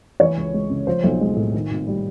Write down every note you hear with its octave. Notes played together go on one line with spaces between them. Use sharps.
E3 C#5
C#2
G#3
C#3
F3 C5
B1
G#3
A2
D#3
G#1
G3